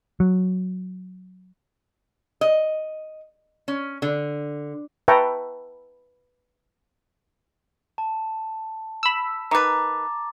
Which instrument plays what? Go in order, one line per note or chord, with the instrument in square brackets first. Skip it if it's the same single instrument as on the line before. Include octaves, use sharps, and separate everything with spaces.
[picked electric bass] F#3
[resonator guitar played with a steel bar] D#5
C#4
D3
[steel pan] B4 E5 G5 A5 A#5 C#6
[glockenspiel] A5
[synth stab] B5 E6
[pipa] D#3 B4 [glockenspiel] A#5 D6 A6